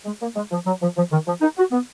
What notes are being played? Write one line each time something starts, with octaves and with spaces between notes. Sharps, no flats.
G#3
A#3
G#3
F3
F#3
F3
F3
D#3
F3
D#4
F#4
B3